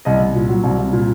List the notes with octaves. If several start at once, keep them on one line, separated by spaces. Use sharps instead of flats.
C2 D#5
C2
A#2
F#3
C2
C2
A#2